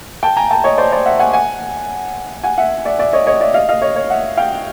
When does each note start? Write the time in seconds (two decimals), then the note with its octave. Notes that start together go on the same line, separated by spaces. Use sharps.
0.23 G5 A5
0.37 G#5 A#5
0.51 G5 A5
0.64 C#5 D#5
0.78 C5 D5
0.92 C5 D5
1.06 E5 F#5
1.19 F#5 G#5
1.33 F#5 G#5
2.43 F#5 G#5
2.58 E5 F#5
2.85 D5 E5
2.99 D5 E5
3.13 C#5 D#5
3.26 C#5 D#5
3.41 D5 E5
3.54 D#5 F5
3.69 D#5 F5
3.82 C#5 D#5
3.96 C#5
4.10 E5 F#5
4.37 F5 G5